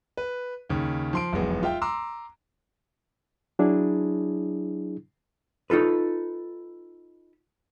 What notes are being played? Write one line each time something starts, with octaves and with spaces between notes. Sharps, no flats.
B4
D#2 C#3
F3 C6 D7
E1 B1 F2 B3 G#4
F4 E5 G5
A#5 C6 D6 E6
F#3 D4 E4 G#4
D#4 F4 A4 B4